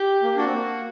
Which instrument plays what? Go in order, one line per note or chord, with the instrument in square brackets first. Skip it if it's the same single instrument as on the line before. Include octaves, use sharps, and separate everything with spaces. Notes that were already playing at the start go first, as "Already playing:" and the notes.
Already playing: [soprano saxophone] G4
[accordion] A#3
[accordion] D4 [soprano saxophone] F#4
[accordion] C4
A#3